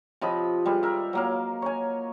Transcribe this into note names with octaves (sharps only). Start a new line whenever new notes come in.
C3 F3 D#5 B5
G3 G#3 B4
A#4 E5
F#3 A#3 F5
C#5 G#5